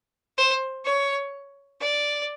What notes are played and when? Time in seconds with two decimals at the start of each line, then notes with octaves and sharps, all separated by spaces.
0.38 C5
0.85 C#5
1.80 D5